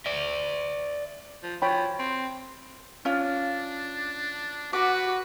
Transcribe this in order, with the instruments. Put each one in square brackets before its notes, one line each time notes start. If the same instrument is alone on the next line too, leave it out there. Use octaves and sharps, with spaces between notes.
[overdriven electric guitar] D5 E5
[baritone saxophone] F3
[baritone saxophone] F3 [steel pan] C#5 G5 B5
[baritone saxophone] C4
[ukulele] C#4 F4 [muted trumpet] D4
[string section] F#4 [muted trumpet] B4 [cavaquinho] D6